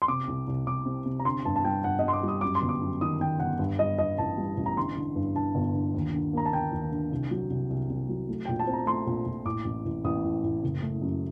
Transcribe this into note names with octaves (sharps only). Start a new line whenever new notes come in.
C6
C3 D6
C2
C2
C2 D6
C3
C3
A#5
D3 C6
G2 A5
A5
G3 G5
G2 F#5
G3 D#5
C6
D6
G3 D#6
F#2 D6
C6
G1
D6
F#2
D#3 D#6
D#3 G5
G1 F#5
G2
G3 D#5
G2 D#5
A1 A5
G3
A1
A#5
D3 C6
D3
G2
D3 A5
G1
D3
D#2
D3
A#3 A#5
A5
D3 G5
D#2
D3
C2
F#3
C2
C2
C2
F#3
A3
A#1 G5
A5
C4
A#5
A3 C6
A#1
A#1
A2 D6
A1
A1
A1 D#6
A2
A2
F#1
A3
F#2